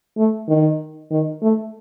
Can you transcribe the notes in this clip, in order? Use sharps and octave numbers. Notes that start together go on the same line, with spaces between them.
A3
D#3
D#3
A3